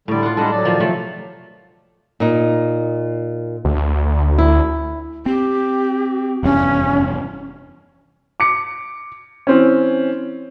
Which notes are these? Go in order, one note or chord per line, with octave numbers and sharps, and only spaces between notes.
A2 D3 G3 D5
F4 F#5
G3 G#3 D4 A4 D#5 F#5
F#3 D5
D#3 F3
C3 F3 F#3 A3
A#2 D#4
D2
E4
C4 G4
F1 E2 G2 C#4
D6 C#7
E3 C4 C#4